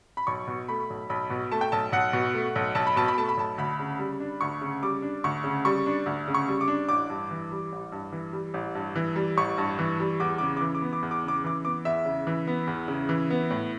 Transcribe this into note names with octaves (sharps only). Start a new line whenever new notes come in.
B5
B1 C#6
B2
A3 B5
B1
B1 B5
B2
A3 A5
G5
B1 A5
B1 F#5
B2
A3
B1
B1 A5
B5
B2 A5
B5
A3 A5
B5
B1 A5
D2 B5
C#3
G3
D4
D2 C#6
C#3
G3 D6
D4
D2 C#6
C#3
G3 C#6
D4
D2
C#3
C#6
G3
D6
D4
A1 D6
G2
E3
G3
A1
G2
E3
G3
A1
G2
E3
G3
A1 C#6
G2
E3
G3
E2 D6
C#3 D6
D6
E3
D6
B3
D6
E2
D6
C#3 D6
E3 D6
B3 D6
E2 E5
C#3
E3
B3
E2
C#3
E3
B3
A2